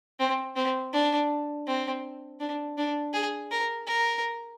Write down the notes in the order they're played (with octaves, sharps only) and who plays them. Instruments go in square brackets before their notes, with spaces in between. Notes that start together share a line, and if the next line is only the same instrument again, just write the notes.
[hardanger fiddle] C4
C4
D4
C4
D4
D4
G#4
A#4
A#4